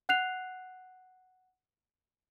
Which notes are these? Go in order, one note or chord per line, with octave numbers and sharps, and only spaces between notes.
F#5 F#6 C7 F7